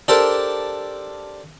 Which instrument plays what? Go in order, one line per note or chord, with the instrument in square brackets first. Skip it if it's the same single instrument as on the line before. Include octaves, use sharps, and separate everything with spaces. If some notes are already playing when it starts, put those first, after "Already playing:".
[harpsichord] D4 G4 A4 A#4 C5